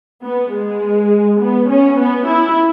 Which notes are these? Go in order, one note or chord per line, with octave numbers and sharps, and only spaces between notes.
B3
G#3
B3
C#4
B3
E4